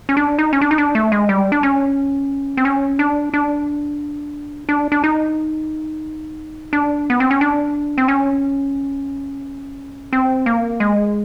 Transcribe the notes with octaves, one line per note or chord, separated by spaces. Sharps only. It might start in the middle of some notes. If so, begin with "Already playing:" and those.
C#4
D4
D#4
C#4
D4
D#4
D4
A3
G#3
G3
D4
C#4
C4
C#4
D4
D4
D4
D4
D#4
D4
B3
C4
C#4
D4
C4
C#4
C4
A#3
G#3